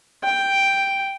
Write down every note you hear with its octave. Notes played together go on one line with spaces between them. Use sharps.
G5